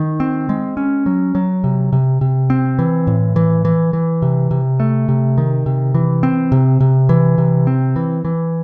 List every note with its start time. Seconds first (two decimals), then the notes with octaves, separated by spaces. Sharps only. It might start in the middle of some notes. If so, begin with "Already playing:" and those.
Already playing: D#3
0.20 C4
0.49 G#3
0.77 C#4
1.06 F#3
1.35 F#3
1.64 C3
1.93 C3
2.21 C3
2.50 C4
2.79 E3
3.07 A2
3.36 E3
3.65 E3
3.93 E3
4.22 C3
4.51 C3
4.80 A3
5.08 C3
5.38 D#3
5.66 C3
5.95 E3
6.23 C4
6.52 C3
6.80 C3
7.09 E3
7.38 C3
7.67 C4
7.96 E3
8.25 E3